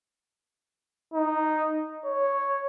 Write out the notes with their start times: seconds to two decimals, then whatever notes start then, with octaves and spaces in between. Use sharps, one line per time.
1.14 D#4
2.05 C#5